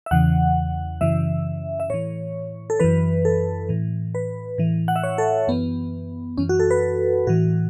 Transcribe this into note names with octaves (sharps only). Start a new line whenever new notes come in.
E5
E2 C#3 E3 F#5
F#2 C#3 E3 E5
E5
A2 E3 C#5
A4
F#2 E3 B4
A4
A2 E3
B4
A2 E3
F#5
E5
C#5
A4
F#2 E3 B3
F#2 E3 C#4
F#4
A4
B4
A2 E3 F#4